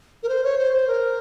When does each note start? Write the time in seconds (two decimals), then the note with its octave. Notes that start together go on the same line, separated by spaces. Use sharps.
0.23 A#4
0.29 C5
0.44 C#5
0.58 C5
0.73 C5
0.88 A#4